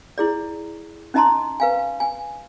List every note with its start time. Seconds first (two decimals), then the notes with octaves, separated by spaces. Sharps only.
0.18 E4 G#4 D5
1.14 C#4 D#4 D#5 A5 A#5 C6
1.60 B4 F5 G#5
2.00 G#5